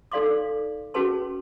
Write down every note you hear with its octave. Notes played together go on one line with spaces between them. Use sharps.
D#4 A4 D5 F5 C6 D6
C#4 F#4 G#4 B4 A5 C6